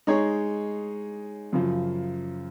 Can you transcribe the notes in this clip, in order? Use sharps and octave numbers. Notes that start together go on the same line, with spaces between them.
G#3 D#4 G#4 C#5
F#2 C#3 F3